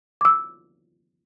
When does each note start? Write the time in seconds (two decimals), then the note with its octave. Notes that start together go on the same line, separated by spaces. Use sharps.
0.21 D6 E6